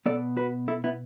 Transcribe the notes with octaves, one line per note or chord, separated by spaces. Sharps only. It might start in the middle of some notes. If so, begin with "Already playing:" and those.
B2 B3 A4 D5
F#4 B4
E4 A4
B3 E4